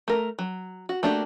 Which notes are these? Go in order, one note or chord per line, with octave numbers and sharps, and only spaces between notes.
A3 A#4
F#3
F#4
A3 A#3 D4 F#4 G4